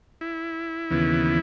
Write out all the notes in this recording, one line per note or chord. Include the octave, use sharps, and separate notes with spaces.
E4
D#2 C#3 E3 B3